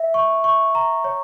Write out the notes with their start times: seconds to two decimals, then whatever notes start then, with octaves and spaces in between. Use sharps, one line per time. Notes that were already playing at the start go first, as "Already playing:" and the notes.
Already playing: E5
0.14 C#6
0.44 C#6
0.75 A#5
1.04 C#5